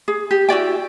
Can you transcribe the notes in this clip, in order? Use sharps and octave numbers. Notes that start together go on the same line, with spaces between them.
G#4
G4
E4 F#4 D5 G5